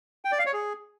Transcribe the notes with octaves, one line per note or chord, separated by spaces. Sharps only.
G5
D5
F5
C#5
G#4